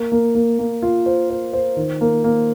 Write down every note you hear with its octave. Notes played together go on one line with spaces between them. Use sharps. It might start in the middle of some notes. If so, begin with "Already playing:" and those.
Already playing: A#3
A#3
A#3
A#3
F4
C5
C5
C5
D#3
A#3
A#3